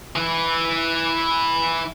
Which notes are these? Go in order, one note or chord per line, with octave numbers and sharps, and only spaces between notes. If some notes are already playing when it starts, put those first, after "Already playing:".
E3 E4